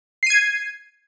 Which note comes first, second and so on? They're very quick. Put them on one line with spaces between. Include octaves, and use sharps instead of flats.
C7 D#7 G#6